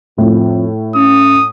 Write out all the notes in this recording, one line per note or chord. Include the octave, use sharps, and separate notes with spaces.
F2 A2
C#4 D#6